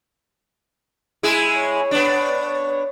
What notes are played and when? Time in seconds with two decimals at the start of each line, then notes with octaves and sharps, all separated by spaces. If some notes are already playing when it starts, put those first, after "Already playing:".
1.23 G#3 E4 G#4
1.56 C#5
1.91 B3 D4
2.45 C#5